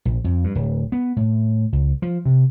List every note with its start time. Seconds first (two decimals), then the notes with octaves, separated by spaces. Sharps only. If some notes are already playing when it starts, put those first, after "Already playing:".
0.05 A#1
0.24 F2
0.44 G2
0.55 D1
0.92 B3
1.16 A2
1.72 C#2
2.02 F3
2.25 C3